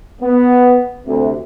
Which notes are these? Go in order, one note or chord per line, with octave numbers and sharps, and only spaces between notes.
B3
D2 C3